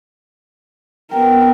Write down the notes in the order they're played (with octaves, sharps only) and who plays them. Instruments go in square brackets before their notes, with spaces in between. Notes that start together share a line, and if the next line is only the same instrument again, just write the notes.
[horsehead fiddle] B3 A#4 [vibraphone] G5